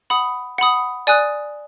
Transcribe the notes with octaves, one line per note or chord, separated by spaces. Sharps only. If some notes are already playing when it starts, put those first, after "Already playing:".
F#5 B5 D#6
F#5 B5 D#6
D5 G#5 D#6 F#6